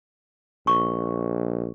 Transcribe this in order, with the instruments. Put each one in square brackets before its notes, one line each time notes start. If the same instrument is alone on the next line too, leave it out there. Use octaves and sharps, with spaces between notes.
[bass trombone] A#1 [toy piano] C#6